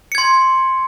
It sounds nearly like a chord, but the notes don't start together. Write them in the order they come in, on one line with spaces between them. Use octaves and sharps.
C#7 G#6 C6